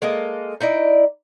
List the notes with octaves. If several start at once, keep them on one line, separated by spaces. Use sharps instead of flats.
G#3 A#3 A4 D#5
D#4 E4 D5 D#5